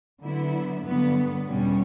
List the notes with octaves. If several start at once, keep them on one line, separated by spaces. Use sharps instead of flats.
D3 F#3 B3 E4
G2 D3 F#3 B3
E2 B2 G3 C#4